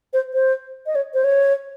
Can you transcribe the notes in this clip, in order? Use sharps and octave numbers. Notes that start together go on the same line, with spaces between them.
C5
C5
D#5
C#5
C5
C#5